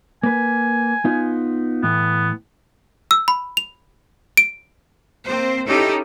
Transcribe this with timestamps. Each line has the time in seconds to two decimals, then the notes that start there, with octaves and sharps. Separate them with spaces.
0.23 A#3 B4 G#5
1.05 B3 D#4 F4
1.83 A2 E3 B3
3.11 E6
3.28 B5
3.57 F7
4.37 D7
5.26 A#3 C4 C5
5.67 C#4 D#4 E4 G4 A4